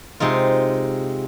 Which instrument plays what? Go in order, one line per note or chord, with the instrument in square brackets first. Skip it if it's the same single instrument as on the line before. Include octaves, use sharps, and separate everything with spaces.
[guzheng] C3 G#3 D#4 F4